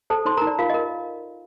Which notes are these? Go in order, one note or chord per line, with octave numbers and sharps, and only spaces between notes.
A4 C5 A5
D#4 C5 C6
A#4 A#5
D#4
D5
F4 A#4 F5
D#5
A#4